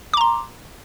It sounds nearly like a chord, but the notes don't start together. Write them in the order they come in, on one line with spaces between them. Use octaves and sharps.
D6 A#5 C6